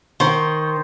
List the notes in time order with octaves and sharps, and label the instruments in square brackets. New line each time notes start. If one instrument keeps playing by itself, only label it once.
[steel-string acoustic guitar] D#3 [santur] C5 C#6